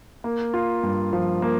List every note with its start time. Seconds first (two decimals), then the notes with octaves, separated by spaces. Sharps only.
0.24 A#3
0.54 F4
0.83 G2
1.13 F3
1.42 A#3